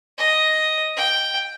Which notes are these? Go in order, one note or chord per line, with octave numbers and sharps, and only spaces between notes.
D#5
G5